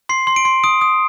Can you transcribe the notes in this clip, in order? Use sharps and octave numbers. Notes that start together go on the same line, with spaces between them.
C6 C7
C6
D7
C6
D#6 D7
D#6